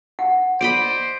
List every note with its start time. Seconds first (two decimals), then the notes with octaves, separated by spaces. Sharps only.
0.19 F#5
0.61 C5 D5 D#5 B5 D7